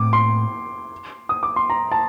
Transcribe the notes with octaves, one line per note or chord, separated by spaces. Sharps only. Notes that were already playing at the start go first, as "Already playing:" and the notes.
Already playing: A2 A3 C4 D6
C6
D#6
D6
C6
A#5
A5